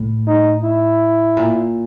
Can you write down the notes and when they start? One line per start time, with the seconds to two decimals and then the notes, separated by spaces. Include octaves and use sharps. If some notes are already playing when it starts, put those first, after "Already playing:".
Already playing: A2
0.27 D#4
0.63 E4
1.37 A#2